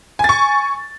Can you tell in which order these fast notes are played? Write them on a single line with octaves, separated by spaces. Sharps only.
G#5 A6 C#6